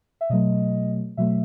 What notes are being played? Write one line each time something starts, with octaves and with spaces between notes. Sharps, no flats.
E5
B2 F#3 A3 D#5
B2 F#3 A3 E5